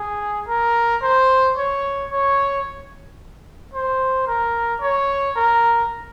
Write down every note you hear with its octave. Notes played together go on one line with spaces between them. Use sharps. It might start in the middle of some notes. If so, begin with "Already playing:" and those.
Already playing: G#4
A#4
C5
C#5
C#5
C5
A#4
C#5
A#4